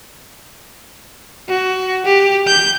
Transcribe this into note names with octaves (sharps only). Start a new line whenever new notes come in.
F#4
G4
G6